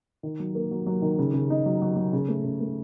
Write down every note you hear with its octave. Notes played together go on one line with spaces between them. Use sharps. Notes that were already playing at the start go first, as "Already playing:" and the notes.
D#3
F#3
A#3
F#3
F#3
D#3
C#3
C#3
D#4
F#3
F#3
F#3
C#3
A3
C#3
A3